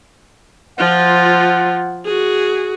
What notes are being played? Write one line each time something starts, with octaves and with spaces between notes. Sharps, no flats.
F3 F4 F#5
F#4 G#4